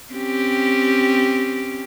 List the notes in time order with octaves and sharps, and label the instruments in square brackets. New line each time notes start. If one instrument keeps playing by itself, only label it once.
[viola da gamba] C4 C#4 G4